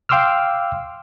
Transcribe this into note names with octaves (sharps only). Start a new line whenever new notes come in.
F5 G5 C6 D6 E6 F6